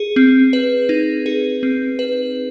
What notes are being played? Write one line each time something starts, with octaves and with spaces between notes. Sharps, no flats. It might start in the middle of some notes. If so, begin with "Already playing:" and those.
Already playing: G#4
C4
B4
D#4
G#4
C4
B4